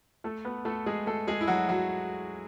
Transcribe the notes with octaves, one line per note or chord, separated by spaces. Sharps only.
A3 A4
B3 B4
A3 A4
G#3 G#4
A3 A4
G#3 G#4
E4
F#3 F#4
F#3 F#4